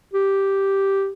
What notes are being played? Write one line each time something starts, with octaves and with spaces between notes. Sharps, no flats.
G4